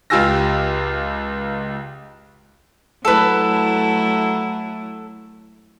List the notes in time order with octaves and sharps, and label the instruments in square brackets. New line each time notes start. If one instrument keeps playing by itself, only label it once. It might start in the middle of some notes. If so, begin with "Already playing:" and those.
[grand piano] C#2 F4 G4 G#5 E6 A#6
[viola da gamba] F#3 A3 E4 [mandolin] A4 B4